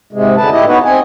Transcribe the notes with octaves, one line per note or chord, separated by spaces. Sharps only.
G#2 C3 G#3
F#2 D3 G#3 B4 A5
A2 E4 G4 D#5
B3 D#4 F#4 B4 C#5
C4 D#5 G#5